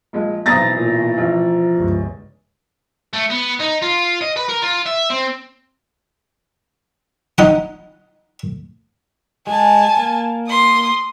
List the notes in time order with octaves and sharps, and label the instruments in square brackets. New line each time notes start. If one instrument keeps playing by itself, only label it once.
[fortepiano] A#1 G#3
[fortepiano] B1 C4 D#6 [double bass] B2 E3 [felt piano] A#5 A6 A#6
[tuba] A#2
[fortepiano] A1 [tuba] F3
[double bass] G1 C#2
[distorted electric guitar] A3
B3
D#4
F4
D#5
B4
A#4
F4
E5
C4
[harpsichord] D#4 F#5
[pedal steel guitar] G#3 [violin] G#5 A5
[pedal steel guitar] A#3
[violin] C6 D#6